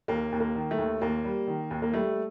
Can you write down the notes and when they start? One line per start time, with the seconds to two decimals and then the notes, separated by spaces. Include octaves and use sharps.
0.08 D#2 A#3
0.32 D#2
0.40 A#3
0.55 D#3
0.71 A3
0.78 D#2
1.01 D#2 A#3
1.24 G3
1.47 D#3
1.71 D#2
1.82 A#3
1.94 G3 A3